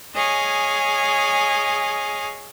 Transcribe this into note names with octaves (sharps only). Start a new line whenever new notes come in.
G#4 C#5 D#5 F5 G#5